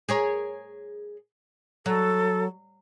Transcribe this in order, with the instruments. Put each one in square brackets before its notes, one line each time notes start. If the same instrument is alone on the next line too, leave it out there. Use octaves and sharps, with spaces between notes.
[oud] G#4 A#4 C#5
[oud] F#3 [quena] A4